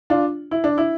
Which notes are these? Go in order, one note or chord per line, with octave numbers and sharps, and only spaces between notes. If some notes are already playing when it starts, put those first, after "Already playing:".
D4 F4
E4
D4
E4